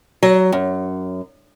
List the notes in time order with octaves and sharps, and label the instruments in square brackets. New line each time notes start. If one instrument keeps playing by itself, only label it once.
[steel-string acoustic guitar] F#3
F#2